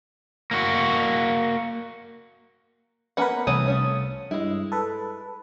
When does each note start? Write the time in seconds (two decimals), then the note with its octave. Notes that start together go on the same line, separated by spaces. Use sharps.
0.51 A#3 F#4
3.17 A#3 B3 C#4 A#4 B4 F#5
3.47 C2 E3 A3 C#5 D#6
3.66 A3 C#4 F4
4.31 G2 G#3 E4
4.72 A4 B4